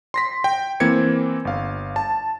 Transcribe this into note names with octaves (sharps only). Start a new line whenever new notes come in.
C6 A#6 B6
G5
E3 A#3 C4 G#6 C#7
G1 F5
A5